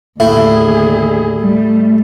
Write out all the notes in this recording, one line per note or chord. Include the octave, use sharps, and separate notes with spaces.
D#2 A2 D3 E4 G#4
G3 A3